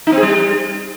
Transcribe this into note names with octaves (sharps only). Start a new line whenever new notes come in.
D#4
C4
G#4
G3